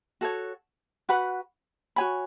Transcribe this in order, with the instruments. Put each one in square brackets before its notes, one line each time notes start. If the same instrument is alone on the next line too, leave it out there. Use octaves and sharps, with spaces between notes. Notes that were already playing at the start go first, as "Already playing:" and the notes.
[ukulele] F#4 A4 C#5
F#4 B4 F#5 B5
F#4 C#5 G#5 B5